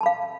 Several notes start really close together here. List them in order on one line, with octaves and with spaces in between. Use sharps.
A5 B5 F5